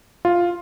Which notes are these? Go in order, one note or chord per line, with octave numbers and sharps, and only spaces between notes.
F4